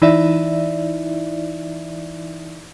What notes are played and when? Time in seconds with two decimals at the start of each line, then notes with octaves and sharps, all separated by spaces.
0.02 E3 D#4 E4 D5 E5